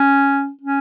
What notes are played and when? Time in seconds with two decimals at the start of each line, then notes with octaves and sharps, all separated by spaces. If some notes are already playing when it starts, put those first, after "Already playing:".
Already playing: C#4
0.61 C#4